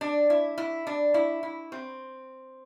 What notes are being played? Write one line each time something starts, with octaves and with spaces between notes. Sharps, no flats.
D4
E4
E4
D4
E4
E4
C4